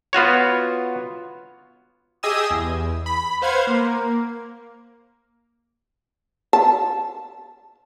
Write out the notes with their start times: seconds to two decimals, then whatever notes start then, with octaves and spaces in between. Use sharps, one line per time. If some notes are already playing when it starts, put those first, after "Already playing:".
0.13 B3 F4 F#4 C#5
2.23 G4 G#4 D#5 G#5 D#6 E6
2.51 E2
3.06 B5
3.42 B4 C5 F5 F#5 G#6
3.67 A#3
6.53 A5